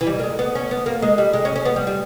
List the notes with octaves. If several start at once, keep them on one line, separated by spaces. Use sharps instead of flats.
E3
G3
A#3
G#3
B3
C#4
B3
A#3
G#3
G3
G#3
C#4
C#4
B3
G3
G3